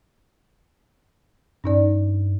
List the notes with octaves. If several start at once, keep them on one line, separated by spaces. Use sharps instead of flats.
G2 C#4 D#4 D5